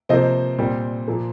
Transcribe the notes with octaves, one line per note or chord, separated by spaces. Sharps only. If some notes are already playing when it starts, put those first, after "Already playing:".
C3 F3 A#3 C5 D#5
A#2 G3 C4
A#2 F3 A#3